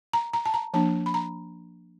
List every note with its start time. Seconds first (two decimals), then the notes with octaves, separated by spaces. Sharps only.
0.13 A#5
0.34 A#5
0.46 A5
0.54 A#5
0.74 F3 A#3 D4 A5
1.06 B5
1.14 A#5